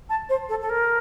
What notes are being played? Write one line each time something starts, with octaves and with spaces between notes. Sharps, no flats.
A5
C5
A4
A4
A#4